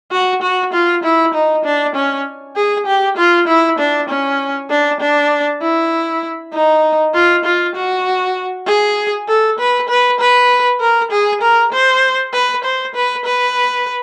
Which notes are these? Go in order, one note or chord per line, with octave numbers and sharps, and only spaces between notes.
F#4
F#4
F4
E4
D#4
D4
C#4
G#4
G4
F4
E4
D4
C#4
D4
D4
E4
D#4
F4
F4
F#4
G#4
A4
B4
B4
B4
A#4
G#4
A#4
C5
B4
C5
B4
B4